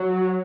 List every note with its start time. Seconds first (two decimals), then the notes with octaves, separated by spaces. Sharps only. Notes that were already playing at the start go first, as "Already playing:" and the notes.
Already playing: F#3